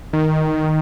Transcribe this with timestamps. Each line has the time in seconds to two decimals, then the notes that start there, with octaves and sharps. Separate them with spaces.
0.13 D#3
0.58 D#3